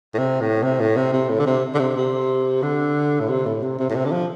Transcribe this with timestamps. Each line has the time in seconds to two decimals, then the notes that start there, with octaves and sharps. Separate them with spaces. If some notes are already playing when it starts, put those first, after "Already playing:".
0.14 A2
0.19 C3
0.41 A2
0.63 C3
0.80 A2
0.97 C3
1.13 C3
1.29 A2
1.40 D3
1.46 C3
1.74 D3
1.79 C3
1.96 C3
2.63 D3
3.20 A2
3.29 C3
3.46 A2
3.63 C3
3.79 C3
3.90 A2
3.95 C3
4.05 D3
4.12 F3